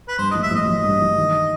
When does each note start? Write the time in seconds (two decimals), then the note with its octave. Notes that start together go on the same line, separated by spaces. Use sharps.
0.08 B4
0.18 G2 C5
0.31 A1 D#5
0.43 E5
0.51 A1 D#5
0.68 F#3
0.84 G2
1.01 A1
1.17 D#3